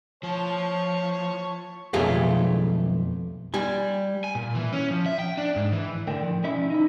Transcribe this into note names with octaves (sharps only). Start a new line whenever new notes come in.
F3 C#5 A5 C#6
B1 F2 A3 F4 G4 G#4
G3 G#5
G#5
A#2
E3
C#4
F3
E5
G5
D4
G#2
E3
A2 D3 A#4 D5 G5
F3
B1 C#4 E4 D5 E5 B5
C#4
D#4 E4